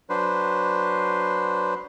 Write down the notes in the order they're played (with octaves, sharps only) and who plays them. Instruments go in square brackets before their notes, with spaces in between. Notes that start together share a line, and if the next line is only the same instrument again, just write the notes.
[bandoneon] F#3 D4 B4 C5